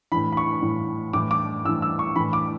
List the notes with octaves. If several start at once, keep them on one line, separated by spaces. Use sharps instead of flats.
A2 E3 B5
B5
C#6
A2 E3
A2 E3 D6
D6
A2 E3 E6
E6
C#6
A2 E3 B5
D6